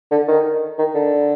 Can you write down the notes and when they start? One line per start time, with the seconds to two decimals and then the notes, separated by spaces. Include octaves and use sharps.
0.11 D3
0.28 D#3
0.79 D#3
0.95 D3